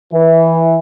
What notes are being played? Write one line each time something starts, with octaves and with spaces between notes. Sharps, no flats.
E3